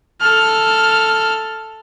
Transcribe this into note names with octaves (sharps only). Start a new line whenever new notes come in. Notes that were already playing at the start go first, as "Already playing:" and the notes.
A4 F6